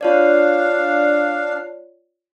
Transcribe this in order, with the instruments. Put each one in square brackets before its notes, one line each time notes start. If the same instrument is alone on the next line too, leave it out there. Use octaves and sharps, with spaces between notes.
[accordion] D4 F5 [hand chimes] F4 C#5 D5